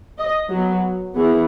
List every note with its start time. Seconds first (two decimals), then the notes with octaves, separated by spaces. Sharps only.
0.18 D#5
0.51 F#3 B3
1.16 E3 B3 G#4